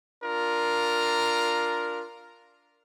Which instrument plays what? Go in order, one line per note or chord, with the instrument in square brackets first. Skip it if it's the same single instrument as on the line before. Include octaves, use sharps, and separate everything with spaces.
[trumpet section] D4 F4 A#4